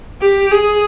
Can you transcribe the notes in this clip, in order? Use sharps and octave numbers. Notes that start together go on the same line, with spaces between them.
G4
G#4